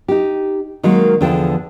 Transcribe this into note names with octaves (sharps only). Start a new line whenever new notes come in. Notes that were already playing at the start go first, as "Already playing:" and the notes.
D#4 G4
D#3 F#3 G#3 A#3
E2 D3 F3 G#4 A4 G5